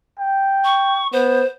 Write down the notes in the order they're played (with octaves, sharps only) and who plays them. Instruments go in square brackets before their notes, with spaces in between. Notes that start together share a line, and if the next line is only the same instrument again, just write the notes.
[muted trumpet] G5
[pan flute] C#6
[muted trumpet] B3 [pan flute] C5